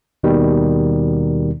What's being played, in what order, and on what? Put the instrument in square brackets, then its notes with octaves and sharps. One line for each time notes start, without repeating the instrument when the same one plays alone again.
[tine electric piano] D#2 B2 D#3 G3